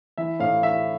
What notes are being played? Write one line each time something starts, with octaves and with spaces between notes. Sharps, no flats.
E3 E5
A2 F5
E3 E5